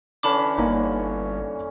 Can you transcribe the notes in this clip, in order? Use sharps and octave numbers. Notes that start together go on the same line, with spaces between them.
D3 E3 C#4 A5 B5 D6
G1 A#3 D#4